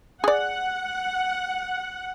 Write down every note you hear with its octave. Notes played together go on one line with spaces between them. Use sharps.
G#4 D5 F#5